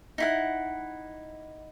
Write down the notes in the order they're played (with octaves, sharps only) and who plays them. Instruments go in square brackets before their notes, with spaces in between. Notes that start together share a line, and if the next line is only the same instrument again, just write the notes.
[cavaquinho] D#4 E4 F#5